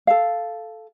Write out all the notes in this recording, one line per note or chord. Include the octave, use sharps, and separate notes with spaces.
A4 F5